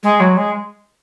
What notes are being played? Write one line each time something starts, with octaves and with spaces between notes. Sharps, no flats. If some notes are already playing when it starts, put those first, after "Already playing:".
G#3
F#3
G#3